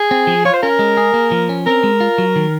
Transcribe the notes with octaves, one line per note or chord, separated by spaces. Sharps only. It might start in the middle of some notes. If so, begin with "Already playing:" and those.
Already playing: G#4
C4
F3
F4 C#5
C5
C#4 A#4
G#3
G#4
A#3
F3
C#4
C4 A#4
G#3
F4
F#3
D#3